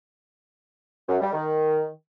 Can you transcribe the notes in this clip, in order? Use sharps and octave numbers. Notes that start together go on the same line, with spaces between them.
F#2
G3
D#3